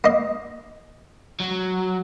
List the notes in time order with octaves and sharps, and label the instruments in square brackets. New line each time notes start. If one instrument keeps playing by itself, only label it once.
[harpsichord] A#3 D#5
[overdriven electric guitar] F#3